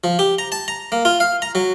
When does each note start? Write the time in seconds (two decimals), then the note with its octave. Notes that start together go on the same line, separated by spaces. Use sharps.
0.04 F3
0.19 G4
0.39 A#5
0.52 A5
0.68 A#5
0.92 A#3
1.05 F4
1.20 F5
1.42 A#5
1.55 F#3